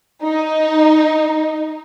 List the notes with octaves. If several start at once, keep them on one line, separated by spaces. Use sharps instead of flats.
D#4